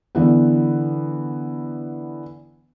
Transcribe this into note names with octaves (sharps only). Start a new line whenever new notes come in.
D3 E3 B3